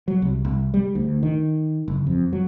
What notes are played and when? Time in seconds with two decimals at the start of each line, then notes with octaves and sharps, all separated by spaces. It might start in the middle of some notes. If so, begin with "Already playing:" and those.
0.08 F#3
0.22 C2
0.45 C2
0.74 G3
0.95 D2
1.23 D#3
1.88 F#1
2.07 F2
2.33 F#3